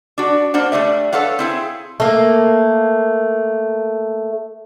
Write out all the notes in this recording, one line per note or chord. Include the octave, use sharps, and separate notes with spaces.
D4 F#4
A#3 D4 C5 F#5
G3 A3 D4 B4 E5
A4 B4 C#5 F5 F#5
C4 E4 G#4
A3 A#3